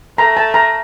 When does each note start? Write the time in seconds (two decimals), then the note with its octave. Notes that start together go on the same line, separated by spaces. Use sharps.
0.18 A3 A#5
0.37 A5
0.54 A#5